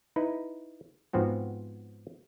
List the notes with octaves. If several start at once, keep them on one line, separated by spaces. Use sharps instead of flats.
D#4 E4 B4
G#2 F3 B3 C4 F#4